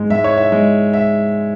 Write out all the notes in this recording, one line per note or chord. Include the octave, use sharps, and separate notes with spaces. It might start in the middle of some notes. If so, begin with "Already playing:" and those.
Already playing: G#2 G#3
G#2 E5
C#5
E5
G#3
E5